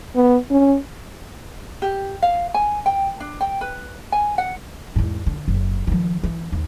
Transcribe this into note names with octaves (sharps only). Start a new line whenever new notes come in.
B3
C#4
G4
F5
G#5
G5
D4
G5
B4
G#5
F#5
E2 G#2
D3
F#1
D#3 F3
E3
D#2